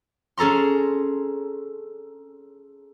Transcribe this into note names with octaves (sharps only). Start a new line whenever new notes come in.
C#4 G#4 A4 A#5 C6